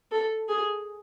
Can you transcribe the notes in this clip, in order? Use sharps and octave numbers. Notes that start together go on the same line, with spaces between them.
A4
G#4